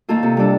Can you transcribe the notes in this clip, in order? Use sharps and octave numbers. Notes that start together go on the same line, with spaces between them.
D#3 A#3 F4 A4
C3
G3 D4 A4